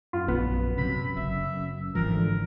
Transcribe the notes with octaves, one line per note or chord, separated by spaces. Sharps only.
F#2 F4
A#1 B3
C3 F#3 B5
F#1 E5
G#1 E3 F3 A#4
D3